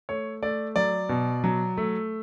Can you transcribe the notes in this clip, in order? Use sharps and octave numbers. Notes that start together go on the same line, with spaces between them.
A3 C#5
A3 D5
F#3 D5
B2
F#3
A3